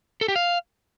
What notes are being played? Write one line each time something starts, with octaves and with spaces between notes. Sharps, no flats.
A4
G4
F5